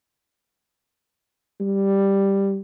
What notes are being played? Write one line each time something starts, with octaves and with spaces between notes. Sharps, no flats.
G3